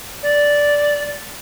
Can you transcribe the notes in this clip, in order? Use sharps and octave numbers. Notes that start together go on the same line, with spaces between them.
D5